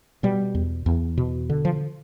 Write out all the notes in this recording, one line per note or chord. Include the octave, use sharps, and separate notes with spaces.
B2 G3
E2
E2
B2
D3
F3